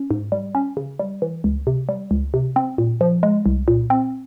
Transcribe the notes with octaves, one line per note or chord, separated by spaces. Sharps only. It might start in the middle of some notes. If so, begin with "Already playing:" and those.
Already playing: C#4
G#2
G3
C#4
C#3
G3
E3
C#2
C3
G3
C#2
C3
C4
A#2
F3
G#3
C2
A#2
C4